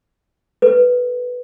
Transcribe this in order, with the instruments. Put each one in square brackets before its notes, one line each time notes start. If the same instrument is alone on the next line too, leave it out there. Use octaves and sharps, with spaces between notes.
[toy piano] A4 B4